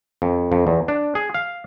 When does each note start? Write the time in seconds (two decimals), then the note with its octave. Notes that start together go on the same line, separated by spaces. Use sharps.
0.22 F2
0.52 F2
0.67 E2
0.88 D4
1.15 G#4
1.34 F5